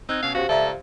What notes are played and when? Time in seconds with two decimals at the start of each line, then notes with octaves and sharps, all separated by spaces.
0.09 C4 D#4 E6 F#6 G#6
0.23 B2 C#4 F5
0.35 F#4 G4 C5 F5
0.49 C#2 A4 D5 E5 A#5